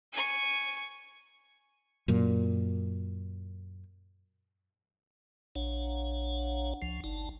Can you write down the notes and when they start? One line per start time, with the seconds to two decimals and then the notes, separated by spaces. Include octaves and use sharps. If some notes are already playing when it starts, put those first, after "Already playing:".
0.13 G#5 C#6
2.08 F#2 A#2
5.55 A#1 D4 C#5 F#5
6.82 C#2 F3
7.04 G1 D#4 A5